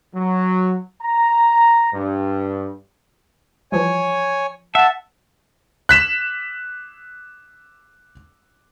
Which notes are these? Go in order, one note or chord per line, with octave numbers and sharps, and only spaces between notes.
F#3
A#5
G2
E3 F3 G3 C#5 G#5
E5 F#5 A5
F#6 B6 E7